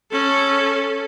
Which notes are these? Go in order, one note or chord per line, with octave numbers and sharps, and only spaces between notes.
C#4 A4